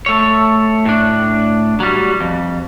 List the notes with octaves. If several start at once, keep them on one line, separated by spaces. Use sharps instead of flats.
A3 C#5
A2 D4
F#3 G3
F2